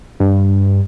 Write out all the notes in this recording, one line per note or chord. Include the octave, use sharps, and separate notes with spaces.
G2